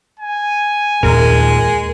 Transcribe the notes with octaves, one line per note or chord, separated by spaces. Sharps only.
G#5
D#2 A#2 G#3 A#4